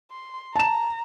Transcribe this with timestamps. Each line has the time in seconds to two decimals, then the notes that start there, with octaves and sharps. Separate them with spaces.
0.11 C6
0.56 A5 A#5 E7